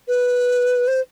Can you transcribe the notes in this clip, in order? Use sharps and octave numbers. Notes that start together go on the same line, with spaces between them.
B4
C5